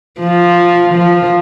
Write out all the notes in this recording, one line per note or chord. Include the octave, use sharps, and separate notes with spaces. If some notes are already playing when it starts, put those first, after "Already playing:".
F3
F3